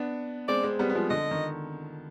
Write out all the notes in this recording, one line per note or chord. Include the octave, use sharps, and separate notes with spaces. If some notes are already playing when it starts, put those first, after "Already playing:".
Already playing: B3 D4
G#3 C4 D5
G#3 C4
G3 B3
B3
F3 G#3
D3 D#5
D#3